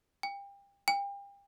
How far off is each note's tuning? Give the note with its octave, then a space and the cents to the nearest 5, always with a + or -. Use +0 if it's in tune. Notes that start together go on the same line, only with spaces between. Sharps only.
G5 +30
G5 +35